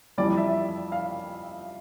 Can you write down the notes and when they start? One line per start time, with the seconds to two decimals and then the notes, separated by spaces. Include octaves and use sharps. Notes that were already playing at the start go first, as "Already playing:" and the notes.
0.18 F2 E3 G3 D5
0.37 E5
0.92 F5